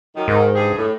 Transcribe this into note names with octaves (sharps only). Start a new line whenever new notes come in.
F#2 D#3
G#2 D#3
G2 G4 G#4
A2